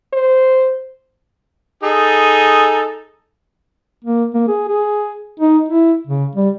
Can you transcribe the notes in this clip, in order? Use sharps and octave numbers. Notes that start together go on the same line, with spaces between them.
C5
D#4 G#4 A4
A#3
A#3
G#4
G#4
D#4
E4
C#3
G3